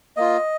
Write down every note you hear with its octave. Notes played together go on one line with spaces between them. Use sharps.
A#3 F4 D#5